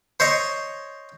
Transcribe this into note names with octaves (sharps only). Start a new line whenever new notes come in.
C5 C#5 D#5